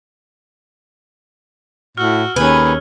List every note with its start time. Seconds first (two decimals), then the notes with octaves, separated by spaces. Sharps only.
1.98 A2 F#4 E6 F6
2.36 D#2 C#4 G#4 B4